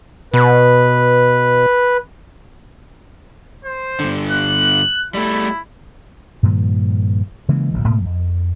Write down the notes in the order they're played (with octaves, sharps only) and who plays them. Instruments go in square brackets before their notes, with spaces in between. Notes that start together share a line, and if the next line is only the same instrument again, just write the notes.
[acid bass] B2 [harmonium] B4
[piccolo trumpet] C5
[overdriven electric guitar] G2 D3
[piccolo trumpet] F#6
[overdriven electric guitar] G3 A3 [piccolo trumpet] E4
[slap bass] G2 A#2 D#3 F3
C#3 E3 G#3 A#3
D1 A#1 G#2
G#2 B2 A3 A#3
F2